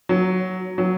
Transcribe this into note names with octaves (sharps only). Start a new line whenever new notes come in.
F#3
F#3